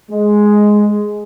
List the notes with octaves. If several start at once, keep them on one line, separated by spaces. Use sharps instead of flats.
G#3